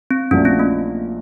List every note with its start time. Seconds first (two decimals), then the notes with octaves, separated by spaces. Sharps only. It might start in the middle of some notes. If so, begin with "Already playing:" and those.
0.11 C4
0.31 A#1 A#2 F#3 A3 C#4 D4
0.45 C4
0.59 A#3